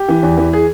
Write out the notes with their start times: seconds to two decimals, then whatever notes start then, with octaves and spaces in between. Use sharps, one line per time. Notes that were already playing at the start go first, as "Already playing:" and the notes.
Already playing: G4
0.08 E3
0.23 E2
0.37 E3
0.53 G#4